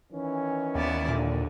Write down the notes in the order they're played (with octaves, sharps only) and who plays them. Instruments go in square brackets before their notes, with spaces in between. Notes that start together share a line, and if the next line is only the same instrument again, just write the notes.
[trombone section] D#3 E3 C#4
[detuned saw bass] D#2 [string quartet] B3 E4 D5
[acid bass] A#2 [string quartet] D3